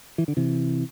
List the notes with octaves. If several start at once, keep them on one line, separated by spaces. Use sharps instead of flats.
E3
D3
C3 E3